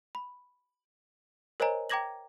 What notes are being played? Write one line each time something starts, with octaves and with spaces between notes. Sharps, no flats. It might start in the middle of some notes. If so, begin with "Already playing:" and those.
B5
A#4 C5 C#5 D#5 G#5 A#5
G5 A#5 D6 G#6 A#6 F#7